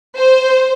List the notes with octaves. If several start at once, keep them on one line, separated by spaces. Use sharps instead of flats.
C5